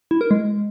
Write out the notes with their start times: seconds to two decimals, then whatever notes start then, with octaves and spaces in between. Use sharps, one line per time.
0.11 E4
0.21 A#4
0.31 G#3